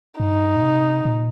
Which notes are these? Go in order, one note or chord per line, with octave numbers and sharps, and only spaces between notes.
G2 D#4
A#2
C3
A#2